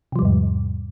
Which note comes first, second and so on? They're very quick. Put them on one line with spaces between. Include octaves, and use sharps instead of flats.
C3 F3 G3 E2 G#2